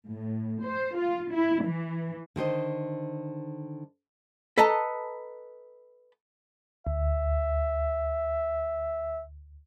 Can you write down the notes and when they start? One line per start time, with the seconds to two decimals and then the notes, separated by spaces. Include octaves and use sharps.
0.11 A2
0.64 C5
0.97 F4
1.33 E4
1.65 E3
2.36 D3 D#3 C5 D#5
4.58 A4 B4 D#5 A5 A#5
6.87 D2 E5